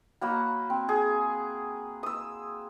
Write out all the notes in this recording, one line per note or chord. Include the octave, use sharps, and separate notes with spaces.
F#3 A#3 F#4 B5
C4
G#4
D#6 E6